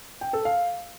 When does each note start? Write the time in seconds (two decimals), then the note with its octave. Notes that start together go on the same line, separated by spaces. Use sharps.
0.21 G5
0.33 A4
0.45 F5